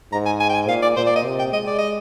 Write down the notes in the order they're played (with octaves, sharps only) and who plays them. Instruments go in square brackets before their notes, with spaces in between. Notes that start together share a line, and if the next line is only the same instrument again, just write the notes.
[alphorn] G#2 [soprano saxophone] A#5
[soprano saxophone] G#5
G#5
G5
G#5
[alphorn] A#2 [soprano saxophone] F5
[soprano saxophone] D5
[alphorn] A#2 [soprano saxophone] C5
[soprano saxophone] D5
D#5
[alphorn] C3
[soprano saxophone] G5
[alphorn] G#3 [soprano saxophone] D#5
[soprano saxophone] D5
D#5